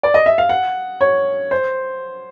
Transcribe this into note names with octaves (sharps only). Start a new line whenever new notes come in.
D5
D#5
E5
F5
F#5
C#5
C5